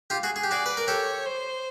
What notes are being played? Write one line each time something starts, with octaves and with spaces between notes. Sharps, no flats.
F4 G4
F#4 G#4
G#4
G4
F#4 G#4 D5
B4
A#4
G4 A4 C#5
C5